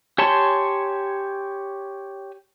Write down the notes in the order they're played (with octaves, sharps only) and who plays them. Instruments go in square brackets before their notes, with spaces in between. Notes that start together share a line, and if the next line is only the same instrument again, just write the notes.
[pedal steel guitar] G4 C#5 G#5 A5 C6